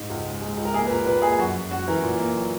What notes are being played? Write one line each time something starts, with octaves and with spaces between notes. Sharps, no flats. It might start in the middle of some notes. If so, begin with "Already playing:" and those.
Already playing: G#2
C#2
G#3
G#3
C#2
A#4
A#3 G#4
B4
A#2 A#4
A#2 B4
A#3 G#4
F#2 F#4
F#2
F#2 F#4
E3 A#4
A#2
A#3
F#3